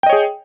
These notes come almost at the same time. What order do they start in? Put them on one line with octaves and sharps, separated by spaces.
G5 D#5 C#5 G#4